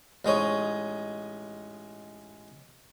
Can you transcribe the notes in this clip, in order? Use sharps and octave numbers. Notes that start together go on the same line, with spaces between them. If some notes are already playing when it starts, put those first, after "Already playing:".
A1 G#3 D#4 C#5